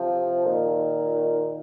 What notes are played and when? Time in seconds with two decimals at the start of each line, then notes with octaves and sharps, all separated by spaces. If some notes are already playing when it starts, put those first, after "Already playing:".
Already playing: C3 F3
0.45 A#2 D#3